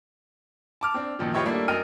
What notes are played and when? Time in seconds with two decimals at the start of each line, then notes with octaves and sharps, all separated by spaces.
0.81 A5 D6 F6
0.94 C4 D4
1.19 F#2 A#2 D#3 F3
1.34 F4 G4 B4 C#5 D#5 E5
1.45 G3 A3 A#3 D4 E4
1.68 F#2 A#4 D#5 G5 F6 D#7